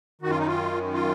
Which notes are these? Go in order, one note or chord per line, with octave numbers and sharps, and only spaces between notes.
F#2 D#3 F#4
F4
D#4
F4
F4